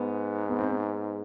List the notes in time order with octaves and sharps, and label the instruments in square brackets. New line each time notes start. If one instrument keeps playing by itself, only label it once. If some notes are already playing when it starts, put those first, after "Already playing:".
Already playing: [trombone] G#2 [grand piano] B3
[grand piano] B3
C4
B3